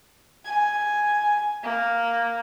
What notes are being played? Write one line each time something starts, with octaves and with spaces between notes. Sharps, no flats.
G#5
A#3